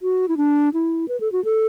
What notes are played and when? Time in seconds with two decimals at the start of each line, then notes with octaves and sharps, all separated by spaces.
0.02 F#4
0.28 E4
0.37 D4
0.74 E4
1.08 B4
1.20 A4
1.32 F#4
1.45 A4